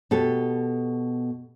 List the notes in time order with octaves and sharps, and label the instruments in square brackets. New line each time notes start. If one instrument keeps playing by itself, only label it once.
[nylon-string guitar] B2 G4 A4